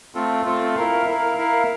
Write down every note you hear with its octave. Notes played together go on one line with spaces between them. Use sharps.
A3 C4 F4 A4
A3 C4 F4 A4
E4 A#4 F5
E4 A#4 F5
E4 A#4 F5